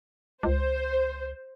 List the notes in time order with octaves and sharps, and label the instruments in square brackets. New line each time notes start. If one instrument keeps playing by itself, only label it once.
[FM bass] C#2 [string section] C5